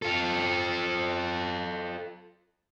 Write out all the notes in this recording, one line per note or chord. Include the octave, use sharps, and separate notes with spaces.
F4 A4